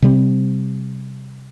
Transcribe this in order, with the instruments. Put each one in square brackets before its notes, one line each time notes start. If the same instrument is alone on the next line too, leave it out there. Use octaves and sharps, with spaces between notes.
[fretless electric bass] C3 G3 C4